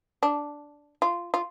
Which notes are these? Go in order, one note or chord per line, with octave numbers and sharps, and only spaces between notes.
D4
F4
F4